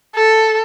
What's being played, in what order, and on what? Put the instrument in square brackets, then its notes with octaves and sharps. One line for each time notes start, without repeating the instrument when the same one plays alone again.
[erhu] A4